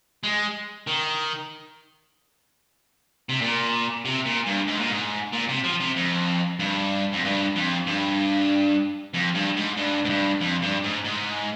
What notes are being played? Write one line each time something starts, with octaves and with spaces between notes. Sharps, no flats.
G#3
D#3
C3
A#2
C3
A#2
G2
G#2
A#2
G#2
A#2
C3
F3
C3
F2
G2
F2
G2
F2
G2
F2
G2
G#2
G2
G#2
G2
F2
G2
G#2
G#2